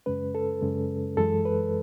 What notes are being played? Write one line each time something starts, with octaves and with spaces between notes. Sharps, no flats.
F#2 C#3 G#3 C#4 B4
A4
F#2 C#3 G#3 C#4
F#2 E3 G#3 A4
B4